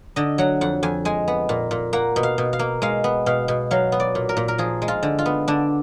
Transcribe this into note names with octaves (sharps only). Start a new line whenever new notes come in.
D3 D#5
F#3 F#5
F2 F#5
F2 G#5
G#3 G#5
B3
A#2
A#2
A#3 F#5
B2
F5
B2
F5
A#3
G#3 F5
B3
B2 F5
B2
F#3 F5
B3
D5
A#2
A#4
A#2
A#4
F3 G#4
G#3
F4
D3
F4
B3
D3 D4